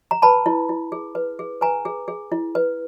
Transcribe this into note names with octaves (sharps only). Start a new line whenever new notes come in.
A#5
B4 A5 B5
E4
E4
G#4
B4
G#4
B4 G#5 A#5
G#4
G#4
E4
B4